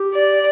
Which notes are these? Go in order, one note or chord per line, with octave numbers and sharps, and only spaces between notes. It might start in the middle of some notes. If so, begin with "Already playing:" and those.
Already playing: G4
D5